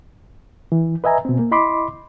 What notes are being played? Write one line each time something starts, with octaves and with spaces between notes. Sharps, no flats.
E3
B4 D#5 E5 G#5 A#5
B2 C4
A#3
E4 D#5 B5 C6 D6